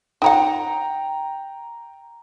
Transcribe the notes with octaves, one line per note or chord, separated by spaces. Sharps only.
D#4 C#5 F#5 G5 A#5